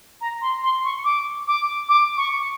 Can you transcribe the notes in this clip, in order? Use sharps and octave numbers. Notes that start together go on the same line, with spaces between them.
A#5
C6
C6
C#6
D6
D6
D6
C#6